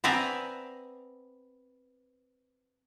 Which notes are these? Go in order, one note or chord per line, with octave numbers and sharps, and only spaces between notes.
B3 C4 D5 E5 G#5 A#5